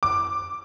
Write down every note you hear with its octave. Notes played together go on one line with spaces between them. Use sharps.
D6